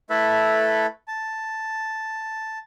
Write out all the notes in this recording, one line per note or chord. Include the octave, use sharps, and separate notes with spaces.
A3 E4 A4 B4 E5
A5